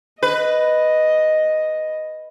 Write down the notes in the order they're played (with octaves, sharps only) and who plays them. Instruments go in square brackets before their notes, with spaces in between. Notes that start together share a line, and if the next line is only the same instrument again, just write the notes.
[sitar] B4 [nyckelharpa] D#5